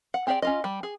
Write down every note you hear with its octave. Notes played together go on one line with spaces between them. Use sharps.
F#5
C4 G4 G#4 D5 G5
C#4 F4 D#5
G3
G#4